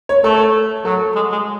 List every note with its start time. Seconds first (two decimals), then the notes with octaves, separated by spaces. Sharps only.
0.09 C#5
0.24 A3 A4
0.85 F#3 A4
1.16 G#3
1.32 G#3